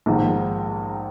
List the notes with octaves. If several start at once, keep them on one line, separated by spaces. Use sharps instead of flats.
A#1 G#2 D#3 G#3